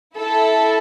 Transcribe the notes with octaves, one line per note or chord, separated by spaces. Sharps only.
E4 A4